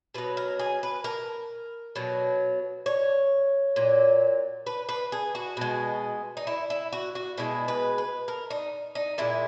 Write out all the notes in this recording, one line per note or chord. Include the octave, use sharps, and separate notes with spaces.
B2 F#3 B4
A#4
G#4
B4
A#4
B2 F#3
C#5
A#2 F#3
B4
B4
G#4
F#4
B2 G#3
D#4
E4
E4
F#4
F#4
B2 G#3 E4
B4
B4
A#4
D#4
D#4
A#2 G#3 E4